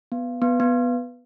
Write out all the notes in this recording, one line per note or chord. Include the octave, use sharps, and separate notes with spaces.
B3
B3
B3